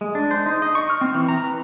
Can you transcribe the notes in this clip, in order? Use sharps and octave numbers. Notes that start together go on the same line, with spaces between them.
G#3
D4
C5
D#4
D#5
C#6
F6
C4
E3
A#5
B4